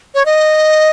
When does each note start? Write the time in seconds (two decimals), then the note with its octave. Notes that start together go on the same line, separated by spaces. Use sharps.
0.15 C#5
0.26 D#5